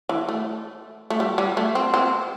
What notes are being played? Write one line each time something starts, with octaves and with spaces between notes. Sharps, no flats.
E3
A3
A3
G3
G3
A3
C4
C4